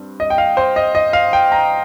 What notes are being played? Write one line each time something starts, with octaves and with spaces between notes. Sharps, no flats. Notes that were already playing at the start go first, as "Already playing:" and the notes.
Already playing: G2 C4
D#5
G5
F5
C5
D#5
D#5
F5
G5
A#5